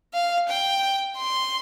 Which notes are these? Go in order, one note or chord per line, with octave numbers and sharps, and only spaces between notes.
F5
G5
C6